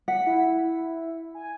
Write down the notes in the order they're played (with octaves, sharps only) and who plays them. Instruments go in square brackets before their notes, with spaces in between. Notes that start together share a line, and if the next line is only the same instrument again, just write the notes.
[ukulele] F#5 [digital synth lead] B6
[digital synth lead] E4
G#5